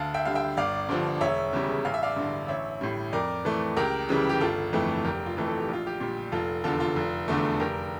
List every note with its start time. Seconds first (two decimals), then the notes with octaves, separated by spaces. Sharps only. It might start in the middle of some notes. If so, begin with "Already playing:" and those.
Already playing: D2 F5 A5
0.14 E5 G5
0.25 D3 G3 F5
0.35 E5 G5
0.57 G1 D5 F5
0.89 G2 D3 F3
1.21 E1 C#5 E5
1.53 E2 C#3 G3
1.85 A1 F5
1.94 E5
2.03 D5 F5
2.16 G2 D3
2.48 A1 C#5 E5
2.81 A2 G3
3.13 F2 A#4 D5
3.45 E3 A3
3.76 C#2 G4 A#4
4.09 C#3 E3 G3
4.29 G4
4.40 G1 F4 A4
4.73 F2 E3 A3
5.04 F1 G4 A#4
5.26 F4
5.37 F2 E3 A3
5.47 A4
5.60 G4
5.68 A#1 F4
5.86 G4
6.00 A#2 G3
6.32 F1 F4 A4
6.64 E2 D3 F4 A4
6.80 F4 A4
6.96 F1
7.28 E2 D3 A3
7.60 F1 G4 A#4